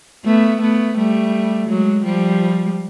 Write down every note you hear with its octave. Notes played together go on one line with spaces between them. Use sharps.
A3 B3
A3 B3
G3 A3
F#3 G#3
F3 G3